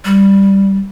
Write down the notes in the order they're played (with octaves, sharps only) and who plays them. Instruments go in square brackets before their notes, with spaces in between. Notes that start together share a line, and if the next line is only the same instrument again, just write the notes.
[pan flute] G3